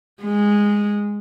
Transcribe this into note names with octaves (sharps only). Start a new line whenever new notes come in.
G#3